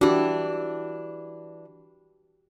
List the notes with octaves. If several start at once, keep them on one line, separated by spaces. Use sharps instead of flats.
E3 D4 F#4 G4